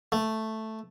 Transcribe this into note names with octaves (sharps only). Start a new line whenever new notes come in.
A3